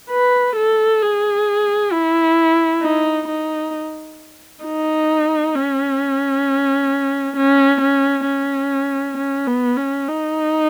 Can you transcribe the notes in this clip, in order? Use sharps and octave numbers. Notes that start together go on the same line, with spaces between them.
B4
A4
G#4
E4
D#4
D#4
D#4
C#4
C#4
C#4
C#4
C#4
B3
C#4
D#4